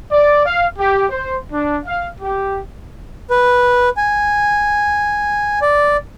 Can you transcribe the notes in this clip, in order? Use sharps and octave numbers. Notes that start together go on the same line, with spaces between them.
D5
F5
G4
C5
D4
F5
G4
B4
G#5
D5